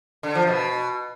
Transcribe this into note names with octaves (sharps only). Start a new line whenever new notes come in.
D3
F3
B2